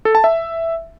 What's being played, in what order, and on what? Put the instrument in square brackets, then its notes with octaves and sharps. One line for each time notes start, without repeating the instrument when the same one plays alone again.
[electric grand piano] A4
A5
E5